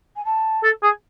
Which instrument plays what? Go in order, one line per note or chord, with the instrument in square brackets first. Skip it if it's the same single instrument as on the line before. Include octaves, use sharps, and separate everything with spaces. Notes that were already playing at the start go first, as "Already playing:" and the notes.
[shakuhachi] G#5
A5
[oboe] A4
G#4